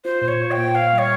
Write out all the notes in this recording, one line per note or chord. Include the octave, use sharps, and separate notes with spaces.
F4 C5
A#2
C#5
F4
G5
A#2
C5 F5
G3
C#5